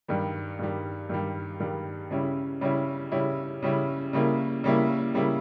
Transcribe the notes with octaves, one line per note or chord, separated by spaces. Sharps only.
G2 D#3 G3
G2 D#3 G3
G2 D#3 G3
G2 D#3 G3
C#3 G3 C#4 E4
C#3 G3 C#4 E4
C#3 G3 C#4 E4
C#3 G3 C#4 E4
C#3 G3 A#3 E4
C#3 G3 A#3 E4
C#3 G3 A#3 E4